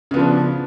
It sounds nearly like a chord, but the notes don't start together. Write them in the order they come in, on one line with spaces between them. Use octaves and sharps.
C#3 B3 F3 D4